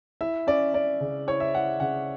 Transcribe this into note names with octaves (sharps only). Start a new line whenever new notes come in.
E4 E5
C#4 D5
C#4 D5
C#3
E4 C#5
E5
E4 F#5
C#3 F#5